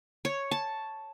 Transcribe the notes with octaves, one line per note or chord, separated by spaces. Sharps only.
C#5
A5